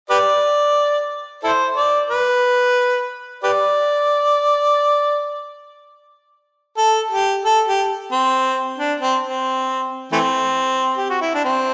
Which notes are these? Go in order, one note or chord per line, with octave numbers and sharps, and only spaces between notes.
G4 B4 D5
E4 A4 C5
D5
B4
G4 B4 D5
A4
G4
A4
G4
C4
D4
C4
C4
E3 A3 C4
G4
F#4
E4
D4
C4